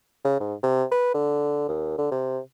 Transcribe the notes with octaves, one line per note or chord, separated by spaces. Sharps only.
C#3
G#2
C3
B4
D3
D#2
D3
C3